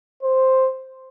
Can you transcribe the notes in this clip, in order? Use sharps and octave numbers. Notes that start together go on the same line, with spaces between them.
C5